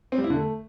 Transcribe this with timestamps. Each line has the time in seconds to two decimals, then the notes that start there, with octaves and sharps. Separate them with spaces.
0.12 C4
0.18 G3
0.24 E4
0.30 D3
0.36 A3